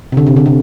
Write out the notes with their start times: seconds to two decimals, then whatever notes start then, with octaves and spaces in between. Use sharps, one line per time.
0.12 C3
0.17 D3
0.27 C3
0.36 D3
0.46 C3